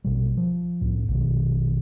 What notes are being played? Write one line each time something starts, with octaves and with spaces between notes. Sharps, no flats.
A#1 B2 G3
F3
C2 A2
A#1 B2 D#3